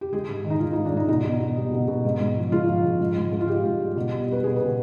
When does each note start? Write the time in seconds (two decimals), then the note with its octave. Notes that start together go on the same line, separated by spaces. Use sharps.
0.01 G4
0.13 G#3 G#4
0.29 G#2
0.44 D#3
0.50 D#4
0.60 G#3 F4
0.73 G#2 D#4
0.85 D4
0.93 G#2 D#4
1.09 B2 D#4
1.25 B2
1.40 B2
1.57 G3
1.73 B2
1.88 B2
2.05 G#2
2.21 G#2
2.37 F3
2.52 G#2 F4
2.69 F3
2.84 G#2
3.00 G#2
3.17 G#2
3.32 G#2
3.41 F4
3.48 G#2 G4
3.64 G#2
3.80 G3
3.96 B2
4.12 G3
4.28 G3 B4
4.43 B2 G#4
4.56 B4
4.60 B2